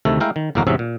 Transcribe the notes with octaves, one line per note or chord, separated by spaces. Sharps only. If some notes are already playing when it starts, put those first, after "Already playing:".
D2 C3 D#3 A3 A4
G#3 A3 E4 A#4 F5 G5
D#3
G1 E2 A2 A#3 F#4 A#4
E2 G#2 C3 F#3 C#4 E5
A#2